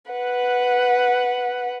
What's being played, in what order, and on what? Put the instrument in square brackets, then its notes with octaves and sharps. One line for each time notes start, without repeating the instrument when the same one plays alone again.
[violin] B4 F#5